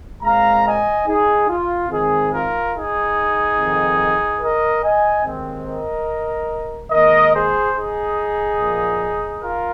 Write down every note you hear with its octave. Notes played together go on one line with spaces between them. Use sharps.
A#2 G#3 C4 F5 A#5
D#5 G#5
D#4 G#4
F4
G#2 D#3 C4 D#4 G#4
F4 A#4
D#4 G#4
F2 C3 D#3
A#4 D#5
D#5 G#5
D#2 D#3 G#3 C4
A#4 D#5
G#2 D#3 A#3 A#4 D#5
G#4 C5
D#4 G#4
A#2 F3 A#3
F4 A#4